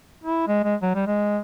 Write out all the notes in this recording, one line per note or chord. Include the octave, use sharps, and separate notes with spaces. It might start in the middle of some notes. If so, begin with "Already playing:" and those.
E4
G#3
G#3
F#3
G3
G#3